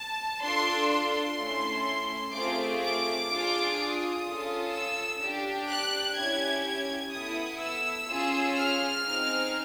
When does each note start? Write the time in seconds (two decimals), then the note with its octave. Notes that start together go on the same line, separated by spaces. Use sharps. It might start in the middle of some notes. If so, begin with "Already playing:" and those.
Already playing: A5
0.42 D4 F4 A4 C6
0.90 C6
1.37 A3 C#4 E4 A4
2.34 A3 C4 F4 G#4 D6
2.82 D6
3.30 D4 F4 G#4
3.77 D#6
4.25 C#4 F4 A4
4.73 E6
5.22 D4 G4
5.69 F#6
6.17 C#4 E4 G4 G#6
6.65 G#6
7.13 B3 E4 A4 D#6
7.61 E6
8.09 C#4 F4 G#4
8.57 F6
9.05 C4 D#4 G#4